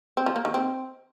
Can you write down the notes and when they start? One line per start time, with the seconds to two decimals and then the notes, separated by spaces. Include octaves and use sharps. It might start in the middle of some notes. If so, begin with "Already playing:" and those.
0.17 C4
0.26 F3
0.36 A#3
0.45 D#3
0.54 C4